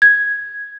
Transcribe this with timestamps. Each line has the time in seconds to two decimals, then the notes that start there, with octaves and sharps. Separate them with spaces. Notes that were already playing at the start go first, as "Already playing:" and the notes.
0.02 G#6